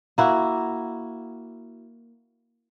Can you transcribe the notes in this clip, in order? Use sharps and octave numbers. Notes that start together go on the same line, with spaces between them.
A#3 E4 F#4